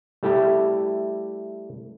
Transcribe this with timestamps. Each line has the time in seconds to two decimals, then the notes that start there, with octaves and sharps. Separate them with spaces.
0.23 G3 A3 E4 G4